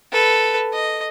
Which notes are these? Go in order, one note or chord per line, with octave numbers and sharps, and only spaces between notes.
A4 B4
D#5